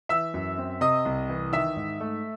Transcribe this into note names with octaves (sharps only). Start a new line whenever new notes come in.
E3 E5 E6
F#2
C4
C3 D#5 D#6
C2
E3
D#3 E5 E6
G#2
A3